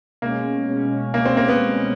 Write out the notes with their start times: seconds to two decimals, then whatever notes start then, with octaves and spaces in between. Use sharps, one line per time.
0.22 B2 G#3 A#3 C#4
0.68 B2 G#3 C#4
1.14 B2 G#3 A#3 C#4
1.25 C4
1.37 A#3
1.48 B3
1.60 B2 G#3 C#4